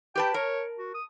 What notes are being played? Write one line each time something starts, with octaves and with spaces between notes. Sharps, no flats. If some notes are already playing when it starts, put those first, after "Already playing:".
G4 B4 G5 A5
A#4 C#5
F#4
D#6